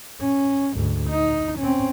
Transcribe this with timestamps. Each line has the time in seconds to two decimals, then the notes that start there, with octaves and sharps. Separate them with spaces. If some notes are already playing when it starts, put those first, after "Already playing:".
0.21 C#4
0.75 D2 G#2
1.10 D#4
1.59 C4 C#4